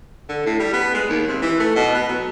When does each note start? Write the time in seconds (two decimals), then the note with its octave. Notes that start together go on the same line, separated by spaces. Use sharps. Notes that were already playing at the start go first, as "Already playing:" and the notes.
0.29 D3
0.46 A2
0.60 G3
0.73 B3
0.94 G#3
1.09 D#2
1.28 C3
1.42 E3
1.60 A3
1.76 B2
1.95 B3
2.09 F#3